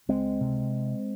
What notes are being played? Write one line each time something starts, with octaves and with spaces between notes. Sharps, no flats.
C#2 G#3 C4
C3